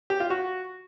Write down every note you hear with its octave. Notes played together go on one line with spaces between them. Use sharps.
G4
F4
F#4